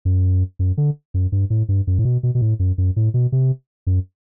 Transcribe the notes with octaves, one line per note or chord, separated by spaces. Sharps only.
F#2
F#2
D3
F#2
G2
A2
G2
F#2
A2
B2
B2
B2
A2
F#2
F#2
A2
B2
C3
F#2